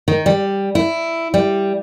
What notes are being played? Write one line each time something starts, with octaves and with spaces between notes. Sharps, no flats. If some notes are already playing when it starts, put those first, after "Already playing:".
D#3
G3
E4
G3